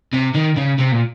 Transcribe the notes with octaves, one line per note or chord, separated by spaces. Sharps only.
C3
D#3
C#3
C3
A#2